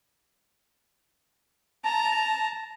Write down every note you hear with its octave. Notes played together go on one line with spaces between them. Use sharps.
A5 A#5